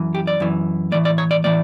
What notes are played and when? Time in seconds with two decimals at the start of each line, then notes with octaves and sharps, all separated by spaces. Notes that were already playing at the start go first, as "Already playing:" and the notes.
Already playing: F#2 E3
0.15 G4
0.27 D5
0.40 F#2 E3
0.92 A2 E3 D5
1.05 D5
1.18 C#5
1.31 D5
1.44 A2 E3 D5